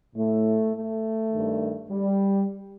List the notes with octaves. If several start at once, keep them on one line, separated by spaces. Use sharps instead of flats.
A2 A3
A3
G2 D#3
G3